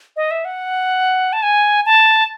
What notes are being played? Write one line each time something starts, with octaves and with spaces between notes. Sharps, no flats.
D#5
E5
F#5
A5
G#5
A5